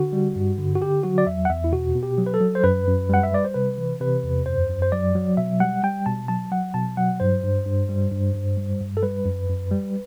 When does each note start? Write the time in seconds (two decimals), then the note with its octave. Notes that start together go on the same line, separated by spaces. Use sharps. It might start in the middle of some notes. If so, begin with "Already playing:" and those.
Already playing: D3 F#4
0.13 G3
0.36 G2
0.58 D3
0.75 F#4
0.81 D3 G4
1.03 F#3 F#4
1.18 D5
1.26 E2 E5
1.45 F#5
1.49 E2 E5
1.64 E4
1.73 B2 F#4
1.95 B2
2.03 G4
2.18 F#3
2.26 B4
2.34 A4
2.41 F#3
2.55 C5
2.64 F#2 B4
2.87 F#2
3.09 G3 F#5
3.23 E5
3.32 G3 D5
3.45 C5
3.54 C3 B4
3.78 E3
4.00 C3 B4
4.23 E2
4.46 F#2 C5
4.69 F#2
4.82 C5
4.92 F#3 D5
5.15 F#3
5.37 B2 E5
5.60 G3 F#5
5.83 G3 G5
6.06 B2 A5
6.28 F#3 A5
6.52 F#3 F#5
6.74 B2 A5
6.97 F#3 F#5
7.20 G2 C5
7.43 G2
7.66 G2
7.89 G3
8.12 G2
8.35 G2
8.57 G3
8.80 G2
8.97 A4
9.03 G3 B4
9.25 F#2
9.49 F#2
9.71 G3